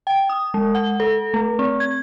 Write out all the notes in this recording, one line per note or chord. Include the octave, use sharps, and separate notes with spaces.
G5
D#6
G#3
F#5
A4
A3
C4
G#6